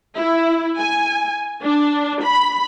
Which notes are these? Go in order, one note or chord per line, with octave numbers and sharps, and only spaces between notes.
E4
G#5
D4
B5